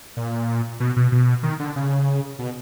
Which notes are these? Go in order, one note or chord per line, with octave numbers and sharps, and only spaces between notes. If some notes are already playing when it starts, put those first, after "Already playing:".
A#2
B2
B2
B2
D#3
D3
C#3
B2